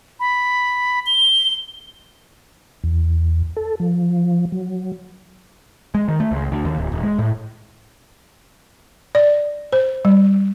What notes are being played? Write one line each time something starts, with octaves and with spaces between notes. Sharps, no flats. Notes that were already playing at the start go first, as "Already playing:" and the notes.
B5
G7
E2
A4
F3
F#3
G#3
D#3
A3
C#2
D2
D#2
D1
D#1
G#3
A2
D5
C5
G3